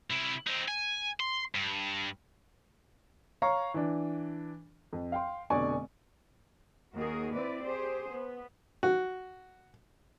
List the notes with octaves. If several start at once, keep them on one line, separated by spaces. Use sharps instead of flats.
C3 E4
C4 D#4
G#5
C6
G2
C#5 F5 A#5 C#6
E3 D4
F2
F5 G5 C6
F1 B2 D3 D5 G#5 C#6
D#2 F#4 G#4 A#4
C4 E4 B4 D5
G4 G#4 C5
B3
F#4